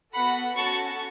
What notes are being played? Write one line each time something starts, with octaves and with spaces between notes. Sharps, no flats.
B3 F#4 A4 F#5 B5
C#4 F#4 A4 A5 C#6